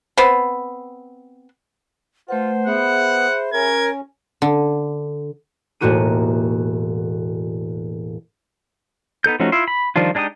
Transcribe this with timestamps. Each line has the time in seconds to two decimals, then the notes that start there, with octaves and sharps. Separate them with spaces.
0.17 B3 C4
2.29 A3 F4 B4 C5 F#5
2.67 B3 G#4 E5 F#5 B5
3.53 C#4 A#4 G#6
4.42 D3
5.81 E1 A2 A#3 F#4 G4 D#7
9.24 B3 D#4 A4 G6
9.40 F3 A3 C#4 D#4 F#4
9.52 E4 F4 E5 C6
9.68 B5
9.96 D#3 F3 G3 D4 F4
10.15 G#3 D4 D#4 G4 D#6